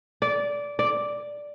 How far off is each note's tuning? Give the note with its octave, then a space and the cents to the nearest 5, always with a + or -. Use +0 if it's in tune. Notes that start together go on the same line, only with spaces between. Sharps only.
D5 -15
D5 +0